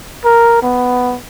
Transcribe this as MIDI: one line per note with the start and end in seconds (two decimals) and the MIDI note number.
0.25 0.60 70
0.63 1.17 59